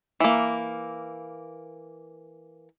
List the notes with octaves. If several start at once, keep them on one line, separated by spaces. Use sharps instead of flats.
E3 A#3